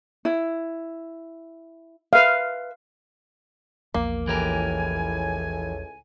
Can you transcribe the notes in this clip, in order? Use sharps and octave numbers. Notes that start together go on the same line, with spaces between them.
E4
B4 E5 F5
A#1 E2 F3 A#3
C#2 A2 E3 G4 A#4 G#5